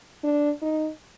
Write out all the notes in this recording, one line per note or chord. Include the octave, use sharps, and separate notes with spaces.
D4
D#4